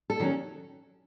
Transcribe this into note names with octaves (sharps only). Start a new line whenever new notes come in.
A4
D#3 F#3 C#4